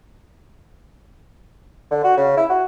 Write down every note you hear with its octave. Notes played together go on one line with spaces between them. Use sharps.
D3
F#4
C#3
E4
F#4